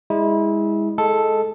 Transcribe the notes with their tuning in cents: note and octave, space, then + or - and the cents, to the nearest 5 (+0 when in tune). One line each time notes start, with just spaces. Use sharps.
G#3 -20 E4 -30
G#3 +15 A4 +0